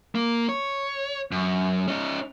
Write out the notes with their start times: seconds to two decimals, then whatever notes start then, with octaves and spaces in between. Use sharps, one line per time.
0.15 A#3
0.49 C#5
1.32 F#2
1.88 C#4 D#4